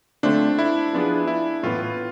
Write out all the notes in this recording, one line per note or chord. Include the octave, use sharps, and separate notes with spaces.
D3 A3 C4 D4 F4
E4
F3 B3 D4 F4 G#4
E4
A2 E3 B3 F4